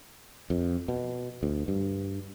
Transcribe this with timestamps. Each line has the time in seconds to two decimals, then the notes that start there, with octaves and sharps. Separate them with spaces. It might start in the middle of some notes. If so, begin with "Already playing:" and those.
0.50 F2
0.88 B2
1.43 D2
1.68 G2